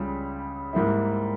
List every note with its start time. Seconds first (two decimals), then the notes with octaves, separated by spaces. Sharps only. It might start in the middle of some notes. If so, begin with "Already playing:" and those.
Already playing: C#2 C#3 G3
0.73 G#2 G3 A#3 E4